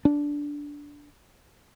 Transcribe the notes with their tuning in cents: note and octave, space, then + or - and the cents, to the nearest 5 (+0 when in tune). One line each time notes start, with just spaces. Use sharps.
D4 -10